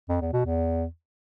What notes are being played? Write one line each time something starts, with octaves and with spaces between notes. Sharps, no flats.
F2
E2
B2
E2